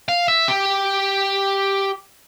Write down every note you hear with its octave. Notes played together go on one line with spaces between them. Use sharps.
F5
E5
G4